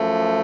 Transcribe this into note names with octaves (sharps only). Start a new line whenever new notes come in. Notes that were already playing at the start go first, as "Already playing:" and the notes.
Already playing: F#2 F3 A3